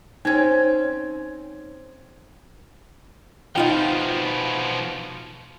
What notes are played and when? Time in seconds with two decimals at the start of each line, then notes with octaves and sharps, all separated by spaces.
0.25 C4 C#4 D#4 G#6
3.56 B2 F3 D#4 F4 G5